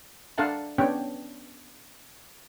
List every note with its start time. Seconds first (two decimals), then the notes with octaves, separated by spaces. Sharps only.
0.38 D4 A4 F5 F#5 A5
0.78 B3 C#4 D4 G4 C#5 G5